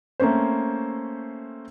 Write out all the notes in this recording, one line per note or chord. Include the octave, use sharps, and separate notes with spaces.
A3 A#3 C4 C#4 C5